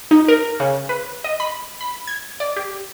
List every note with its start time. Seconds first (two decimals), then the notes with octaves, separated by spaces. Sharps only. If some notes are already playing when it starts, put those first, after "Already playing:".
0.11 D#4
0.28 A#4
0.60 C#3
0.89 B4
1.24 D#5
1.40 B5
1.81 B5
2.07 G#6
2.40 D5
2.56 G4